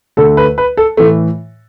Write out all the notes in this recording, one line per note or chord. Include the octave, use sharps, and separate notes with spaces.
D2 D3 A3 A4
B4
B4
A4
A2 E3 A3